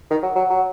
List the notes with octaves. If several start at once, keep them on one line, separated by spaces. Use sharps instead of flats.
D#3
F#3
F#3
F#3